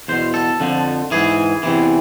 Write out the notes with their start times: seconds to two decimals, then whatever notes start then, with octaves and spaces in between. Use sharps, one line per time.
0.08 E2 B2 C5
0.34 A4
0.60 F2 D3 F3
1.11 G#2 E3 G#4
1.63 E2 C3 E3